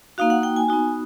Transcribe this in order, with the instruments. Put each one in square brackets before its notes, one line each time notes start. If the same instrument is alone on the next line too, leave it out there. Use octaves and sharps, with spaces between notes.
[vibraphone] A#3 D#4 F#4 F5
F#5
G5
G#5
B3 D#4 F#4